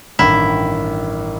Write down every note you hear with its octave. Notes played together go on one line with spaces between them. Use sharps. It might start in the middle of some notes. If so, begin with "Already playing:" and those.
A1 G2 D#3 E4